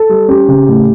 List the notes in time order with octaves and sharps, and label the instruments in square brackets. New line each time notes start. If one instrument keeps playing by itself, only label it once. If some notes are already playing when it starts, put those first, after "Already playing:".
Already playing: [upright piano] A4
G3
C#4 G4
C#3
A2